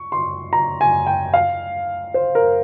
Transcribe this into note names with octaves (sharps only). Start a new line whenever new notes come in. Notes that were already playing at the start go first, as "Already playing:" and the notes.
Already playing: C#6
C6
A#5
G#5
G5
F5
C5
A#4